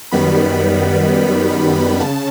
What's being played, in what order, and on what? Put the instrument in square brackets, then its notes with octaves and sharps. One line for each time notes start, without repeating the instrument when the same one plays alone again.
[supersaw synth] F#2 D#3 G3 B3 B5
C#3 A5